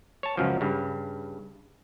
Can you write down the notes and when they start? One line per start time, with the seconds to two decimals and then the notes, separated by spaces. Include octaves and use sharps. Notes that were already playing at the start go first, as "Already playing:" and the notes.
0.23 C#5 A5
0.37 C#2 F#2 F3
0.61 G2 C#3